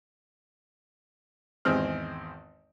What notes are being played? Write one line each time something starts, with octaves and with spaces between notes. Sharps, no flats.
G#1 E2 G#3 C4 F6